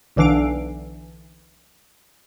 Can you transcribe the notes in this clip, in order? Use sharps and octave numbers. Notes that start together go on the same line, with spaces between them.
B1 D3 E3 D4 F5 D7